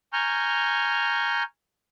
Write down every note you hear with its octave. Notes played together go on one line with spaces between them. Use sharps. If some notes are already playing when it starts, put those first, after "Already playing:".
G#5 A#5 C#6 F6 G6